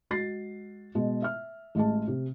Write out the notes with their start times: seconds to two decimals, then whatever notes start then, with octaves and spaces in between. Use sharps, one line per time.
0.10 G#3 F#4 A6 C7
0.95 B2 G#3
1.22 E5 F6
1.75 A1 G#3 G#4 A5
2.08 C3